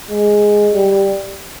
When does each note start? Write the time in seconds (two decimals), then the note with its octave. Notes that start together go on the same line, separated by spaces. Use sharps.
0.11 G#3
0.74 G3